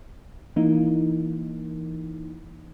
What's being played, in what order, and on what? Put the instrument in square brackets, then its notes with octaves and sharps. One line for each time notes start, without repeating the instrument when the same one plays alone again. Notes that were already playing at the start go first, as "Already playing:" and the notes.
[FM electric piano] E3 A#3 D#4